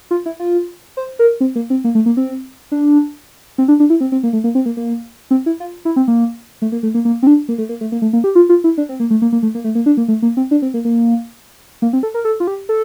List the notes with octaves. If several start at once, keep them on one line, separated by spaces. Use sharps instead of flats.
F4
E4
F4
C5
A#4
C4
A#3
C4
A#3
A3
A#3
C4
D4
C4
D4
D4
E4
C4
C4
A#3
A3
A#3
C4
A#3
A#3
C4
E4
F4
E4
C4
A#3
A3
A#3
A3
A#3
A#3
C4
D4
A#3
A3
A#3
A3
A#3
A3
A#3
G4
F4
F4
E4
D4
C4
A#3
A3
A#3
A#3
A3
A#3
A3
A#3
D4
A#3
A3
A#3
C4
D4
C4
A#3
A#3
A#3
C4
A4
A#4
A4
F4
G4
A4